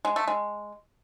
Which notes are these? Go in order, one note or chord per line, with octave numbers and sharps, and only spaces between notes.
G#3
A3
G#3